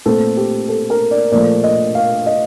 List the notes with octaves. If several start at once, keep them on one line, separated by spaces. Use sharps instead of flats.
A#2 A3 C4 A4
G4
A4
A#4
D5
A#2 F3 A3 D5
D#5
F5
D#5